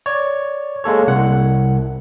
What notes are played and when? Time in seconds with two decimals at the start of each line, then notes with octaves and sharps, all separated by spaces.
0.06 C#5 D5
0.84 G#3 A#3 A4 C#5
1.07 C2 F#5